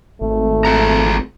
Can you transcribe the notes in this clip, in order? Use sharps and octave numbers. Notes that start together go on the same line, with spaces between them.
G#1 A3
F4 G#4 A#5